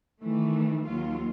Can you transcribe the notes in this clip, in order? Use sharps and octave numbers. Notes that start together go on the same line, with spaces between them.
D#3 E3 A3
D#2 F#3 F4